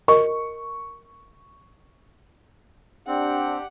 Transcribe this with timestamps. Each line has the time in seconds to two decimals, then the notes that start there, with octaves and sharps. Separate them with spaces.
0.08 A#4 D#5 C#6
3.07 C4 D4 G4 F#5